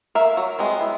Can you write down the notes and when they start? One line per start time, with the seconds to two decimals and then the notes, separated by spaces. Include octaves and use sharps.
0.15 A#4 E5 F5
0.37 F#3
0.59 G#3 B3 C4
0.81 E4